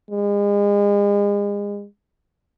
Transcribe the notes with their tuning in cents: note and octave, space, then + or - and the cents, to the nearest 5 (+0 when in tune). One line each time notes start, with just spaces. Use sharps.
G#3 -35